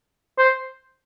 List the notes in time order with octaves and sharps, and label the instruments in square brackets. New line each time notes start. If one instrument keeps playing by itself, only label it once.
[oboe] C5